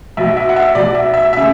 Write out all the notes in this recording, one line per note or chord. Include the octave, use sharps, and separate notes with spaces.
B1 B2 F#3 E5
E5
F#5
E5
B1 B2 F#3 D5
E5
E5
C#3 E5